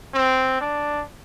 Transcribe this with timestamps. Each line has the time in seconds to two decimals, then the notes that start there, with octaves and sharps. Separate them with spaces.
0.14 C4
0.61 D4